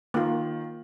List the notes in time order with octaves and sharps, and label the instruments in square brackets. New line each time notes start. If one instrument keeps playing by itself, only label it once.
[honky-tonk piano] D#3 [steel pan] A#3 F4